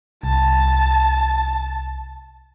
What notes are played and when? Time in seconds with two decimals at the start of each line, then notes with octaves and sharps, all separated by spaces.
0.23 C2 A5